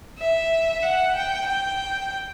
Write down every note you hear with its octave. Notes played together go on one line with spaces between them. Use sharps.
E5
F#5
G5
G5